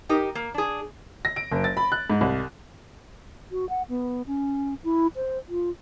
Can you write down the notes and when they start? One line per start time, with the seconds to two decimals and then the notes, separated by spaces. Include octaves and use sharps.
0.09 D#4 G4 A#4 D#5
0.35 A#3
0.54 D4 G#4
1.25 A#6
1.36 D7
1.52 F#1
1.64 A6
1.77 B5
1.92 F#6
2.10 G#2
2.21 C2
3.52 F#4
3.69 F#5
3.89 B3
4.27 C#4
4.84 E4
5.16 C5
5.49 F4